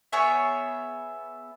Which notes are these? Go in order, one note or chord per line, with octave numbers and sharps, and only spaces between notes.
B3 G#4 C#5 E5